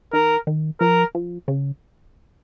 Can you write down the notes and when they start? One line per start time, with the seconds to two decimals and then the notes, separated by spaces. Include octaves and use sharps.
0.13 D#3 A#4
0.47 D#3
0.80 F3 A#4
1.15 F3
1.48 C#3